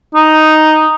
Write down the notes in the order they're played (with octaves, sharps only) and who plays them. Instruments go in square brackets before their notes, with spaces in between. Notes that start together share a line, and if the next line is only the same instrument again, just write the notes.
[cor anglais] D#4